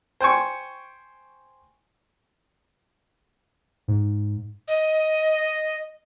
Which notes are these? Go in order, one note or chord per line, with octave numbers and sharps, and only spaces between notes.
C5 G5 G#5 C#6
G#2
D#5